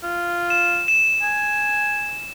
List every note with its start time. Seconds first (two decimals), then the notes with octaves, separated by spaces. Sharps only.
0.03 F4
0.50 E7
0.88 E7
1.22 G#5